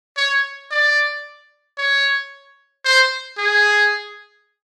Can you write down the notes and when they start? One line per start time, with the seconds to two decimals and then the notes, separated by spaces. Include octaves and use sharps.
0.17 C#5
0.71 D5
1.78 C#5
2.85 C5
3.38 G#4